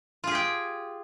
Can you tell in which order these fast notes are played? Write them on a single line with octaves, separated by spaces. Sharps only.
F4 G#4 G4 G5